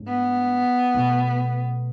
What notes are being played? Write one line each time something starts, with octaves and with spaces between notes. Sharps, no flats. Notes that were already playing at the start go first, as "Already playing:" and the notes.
Already playing: G#2 F#3 A3 D4
B3
B2 F#3 A3